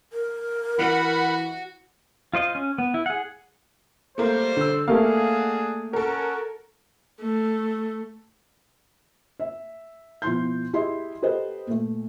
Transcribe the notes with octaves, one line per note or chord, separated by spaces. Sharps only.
A#4
E3 F#4 F#5 B5
F4 C5 D#5 F5
C#4
B3
E4
G#4 F#5
G3 A3 A#3 C5
D3 E6
A3 A#3 D4 F#4 G#4 F5
C#4 F#4 A4 A#4
A3
E5
B2 F3 E4 F4 C6 G6
E4 G4 G#4 D#5 E5 C6
F#4 G4 A4 B4 C5 D#5
A#2 A3